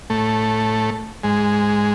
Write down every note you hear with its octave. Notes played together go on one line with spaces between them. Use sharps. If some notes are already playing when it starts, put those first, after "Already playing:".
A2 A3
G#2 G#3